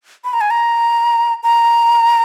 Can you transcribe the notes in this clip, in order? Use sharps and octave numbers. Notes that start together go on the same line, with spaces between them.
B5
A#5
G#5
A#5
A#5